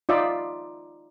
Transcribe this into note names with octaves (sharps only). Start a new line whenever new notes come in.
D#4 F4 D5 E5